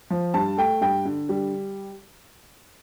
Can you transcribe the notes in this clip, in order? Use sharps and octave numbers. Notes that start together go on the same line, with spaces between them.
F3
G2 A5
A3 G5
G2 G5
D3
G3